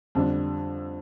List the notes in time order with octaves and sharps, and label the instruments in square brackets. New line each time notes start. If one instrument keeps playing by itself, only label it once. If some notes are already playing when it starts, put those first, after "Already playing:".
[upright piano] F2 D3 G3 D4